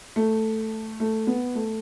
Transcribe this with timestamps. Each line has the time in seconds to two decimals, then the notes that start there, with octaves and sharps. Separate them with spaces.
0.16 A3
1.00 A3
1.27 B3
1.55 A3